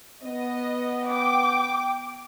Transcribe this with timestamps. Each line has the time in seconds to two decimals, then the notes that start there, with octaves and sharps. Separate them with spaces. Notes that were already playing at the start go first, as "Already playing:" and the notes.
0.23 B3 D#5
1.08 G5 D6